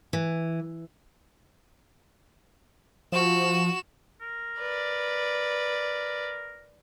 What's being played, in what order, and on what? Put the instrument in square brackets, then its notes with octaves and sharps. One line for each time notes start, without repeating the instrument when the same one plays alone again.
[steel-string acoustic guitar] E3
[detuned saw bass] F3 [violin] F#4 E7
[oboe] A#4
[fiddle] B4 D5